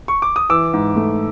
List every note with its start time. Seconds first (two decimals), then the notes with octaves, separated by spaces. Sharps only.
0.08 C#6
0.22 D6
0.36 D#6
0.49 E3 D6 E6
0.74 G#2
0.96 A3